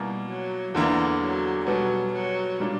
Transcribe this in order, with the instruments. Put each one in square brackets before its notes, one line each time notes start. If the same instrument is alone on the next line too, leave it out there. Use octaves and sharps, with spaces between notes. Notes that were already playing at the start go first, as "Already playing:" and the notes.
Already playing: [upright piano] B2 A#3 E4 [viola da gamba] G3
[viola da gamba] F#3
[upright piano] E2 D3 A#3 D4 [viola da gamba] E3
[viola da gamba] F#3
[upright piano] B2 G3 B3 [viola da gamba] F#3
[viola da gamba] F#3
[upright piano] A#2 G3 A#3 D4